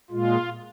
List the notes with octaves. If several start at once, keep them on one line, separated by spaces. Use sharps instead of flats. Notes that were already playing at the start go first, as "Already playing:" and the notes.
A#2 G#3 F4